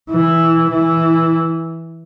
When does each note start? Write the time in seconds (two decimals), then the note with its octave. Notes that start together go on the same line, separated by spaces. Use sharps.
0.10 E3
0.71 E3